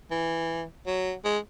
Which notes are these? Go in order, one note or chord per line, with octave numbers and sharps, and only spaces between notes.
E3
F#3
G#3